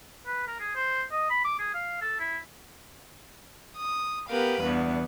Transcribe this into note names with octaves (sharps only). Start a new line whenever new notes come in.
B4
A#4
G#4
C5
D#5
B5
D6
G#4
F5
A4
E4
D#6
B3 G4 A#4 B4 F5
E2 G2 B3